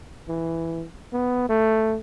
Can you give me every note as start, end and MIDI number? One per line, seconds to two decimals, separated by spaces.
0.28 0.84 52
1.13 1.44 59
1.49 1.97 57